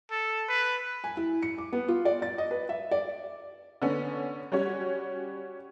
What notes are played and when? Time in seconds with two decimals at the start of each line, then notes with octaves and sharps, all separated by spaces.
0.11 A4
0.49 B4
1.04 G#5
1.17 E4
1.42 C#7
1.58 D6
1.73 B3
1.88 F4
2.05 D5
2.22 A6
2.38 D#5
2.51 B4
2.69 E5
2.91 D5
3.82 D3 B3 C#4
4.52 G3 C#4 F#4 C#5